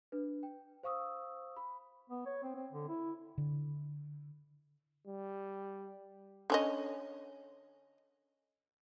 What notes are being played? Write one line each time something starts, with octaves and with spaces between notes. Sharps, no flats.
D4 B4
G5
C5 F5 C#6 D#6 E6
B5
B3
C#5
C4
C4
D3
E4
D3
G3
D3 C#4 D#5